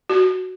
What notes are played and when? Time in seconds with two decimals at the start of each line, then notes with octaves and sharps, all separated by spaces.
0.10 F#4